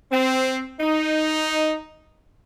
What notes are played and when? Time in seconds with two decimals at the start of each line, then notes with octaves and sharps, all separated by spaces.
0.12 C4
0.80 D#4